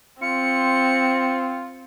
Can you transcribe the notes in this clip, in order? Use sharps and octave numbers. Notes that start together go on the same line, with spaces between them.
C4 F4 C#7